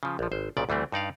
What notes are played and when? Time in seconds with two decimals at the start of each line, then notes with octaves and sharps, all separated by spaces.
0.03 C#3 F3
0.19 A#1 F3
0.32 G#1 C5
0.57 B1 A#2 C#3 D5
0.69 D2 E3 G3 A3 C4
0.92 G2 D#4 D5 F5